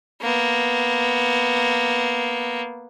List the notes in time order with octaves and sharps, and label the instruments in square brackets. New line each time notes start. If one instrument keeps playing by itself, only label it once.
[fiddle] A#3 B3